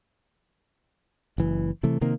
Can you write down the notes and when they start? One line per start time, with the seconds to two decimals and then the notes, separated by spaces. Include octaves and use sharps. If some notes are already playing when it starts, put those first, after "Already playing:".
1.38 F#1 E3
1.83 C3 E3 A3
2.01 C3 D#3 A#3